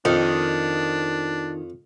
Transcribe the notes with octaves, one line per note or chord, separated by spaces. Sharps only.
F2 D#3 D4